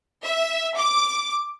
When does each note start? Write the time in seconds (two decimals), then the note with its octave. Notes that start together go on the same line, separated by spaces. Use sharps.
0.23 E5
0.76 D6